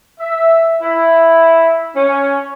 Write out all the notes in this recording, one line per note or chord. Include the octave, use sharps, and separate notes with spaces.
E5
E4
C#4